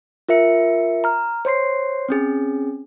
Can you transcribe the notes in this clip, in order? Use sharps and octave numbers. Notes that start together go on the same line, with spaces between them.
F4 A#4 E5 C#7
A#5 F6
C5 C#5 C6 C7
C4 C#4 G#4